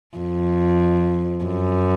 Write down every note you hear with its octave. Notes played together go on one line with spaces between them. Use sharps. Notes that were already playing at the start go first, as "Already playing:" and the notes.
F2
F#2